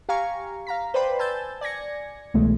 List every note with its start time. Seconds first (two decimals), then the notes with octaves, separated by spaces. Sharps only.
0.09 G4 F5 G#5 A#5 C#6
0.67 F5 A#5 B6
0.94 B4 C5 D5 G5 B5 C6
1.19 G#5 A5 E6 G6 A6
1.61 D5 G#5 G#6 A#6 C#7
2.34 C2 B2 E3 G#3 A3